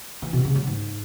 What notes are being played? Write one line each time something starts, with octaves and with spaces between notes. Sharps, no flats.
E3
B2
C#3
F#3
G#2